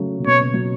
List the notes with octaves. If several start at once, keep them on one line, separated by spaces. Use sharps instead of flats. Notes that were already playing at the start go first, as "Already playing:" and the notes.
Already playing: C#3 F#3 A3
C#3
B2 C#5
C#3
F#3